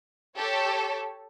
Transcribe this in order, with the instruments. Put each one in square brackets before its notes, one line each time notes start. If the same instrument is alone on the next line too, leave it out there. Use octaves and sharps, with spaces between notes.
[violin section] G4 A4 C#5